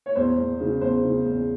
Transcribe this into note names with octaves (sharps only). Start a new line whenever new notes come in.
C#5
E2 C5
E2
C#3
E2 C5
C#3
E2